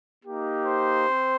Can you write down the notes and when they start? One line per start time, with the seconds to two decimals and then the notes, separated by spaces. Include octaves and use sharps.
0.24 A#3 D#4 G4
0.66 C5
1.07 C4